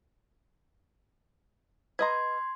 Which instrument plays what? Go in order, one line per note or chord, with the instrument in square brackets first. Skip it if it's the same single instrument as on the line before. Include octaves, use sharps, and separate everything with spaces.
[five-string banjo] B4 D#5 A#5 [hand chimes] C6 G#6